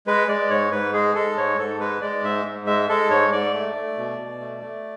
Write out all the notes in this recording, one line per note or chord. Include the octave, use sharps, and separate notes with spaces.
G#3 B4
G#3 D5
G#2 C#5
G#2 B4
G#3 G#4
G#3 A4
G#2 C#5
G#2 A4
G#3 B4
G#3 D5
G#2 E5
G#2
G#3 E5
G#3 A4
G#2 C#5
G#2 D5
A3
A3
B2
B2
A3
A3